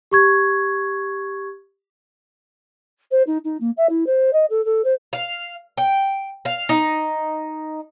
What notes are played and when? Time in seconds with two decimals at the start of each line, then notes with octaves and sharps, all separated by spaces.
0.11 G4 C#6 G#6
3.11 C5
3.27 D#4
3.44 D#4
3.61 A#3
3.77 E5
3.90 E4
4.07 C5
4.33 D#5
4.50 A4
4.65 A4
4.84 C5
5.13 F5
5.78 G5
6.45 F5
6.69 D#4